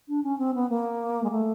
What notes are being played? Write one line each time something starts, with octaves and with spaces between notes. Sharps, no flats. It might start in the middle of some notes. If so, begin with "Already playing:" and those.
D4
C#4
C4
B3
A#3
G#3
A3